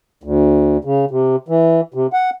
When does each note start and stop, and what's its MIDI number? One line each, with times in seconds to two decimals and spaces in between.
0.24 0.77 38
0.85 1.05 49
1.11 1.36 48
1.48 1.81 52
1.94 2.07 48
2.13 2.30 78